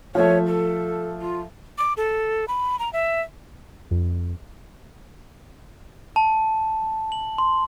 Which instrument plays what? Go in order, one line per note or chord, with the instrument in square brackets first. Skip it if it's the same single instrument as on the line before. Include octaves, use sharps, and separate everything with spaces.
[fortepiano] F3 A3 E5 [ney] C#5
[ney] A4
F4
[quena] D6
A4
B5
A#5
E5
[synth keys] F2
[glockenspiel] A5
F#7
C6